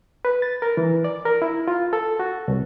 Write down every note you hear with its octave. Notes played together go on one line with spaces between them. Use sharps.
B4
A6
A#4
E3
D5
A#4
E4
F4
A4
F#4
C2